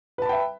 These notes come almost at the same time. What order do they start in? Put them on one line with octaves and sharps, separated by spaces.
B4 A5 B5 G5 E5